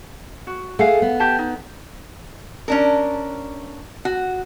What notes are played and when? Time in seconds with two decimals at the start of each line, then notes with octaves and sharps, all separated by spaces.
0.47 F#4
0.79 A3 G#4 F5 F#5
1.02 B3
1.19 G4 A5
1.39 D#4
2.68 C#4 D4 A#4
4.05 F#4